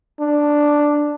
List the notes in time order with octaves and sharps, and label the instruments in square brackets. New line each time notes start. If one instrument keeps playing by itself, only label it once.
[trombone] D4